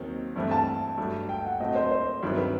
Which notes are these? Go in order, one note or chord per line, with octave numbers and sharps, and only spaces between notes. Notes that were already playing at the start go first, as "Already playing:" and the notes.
Already playing: D#2 D#3 F#3 C4
G2 E3 A3 C4
A5
G2 F#3 A3
G5
F#5
A2 F#3 A3 C4 D#5
C5
C5
G2 D#3 F#3 C4 E4
B4